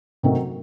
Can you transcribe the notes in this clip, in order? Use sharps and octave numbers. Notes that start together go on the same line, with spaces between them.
C3 D#3 F#3 A3 C4